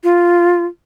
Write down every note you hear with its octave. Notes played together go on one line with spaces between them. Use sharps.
F4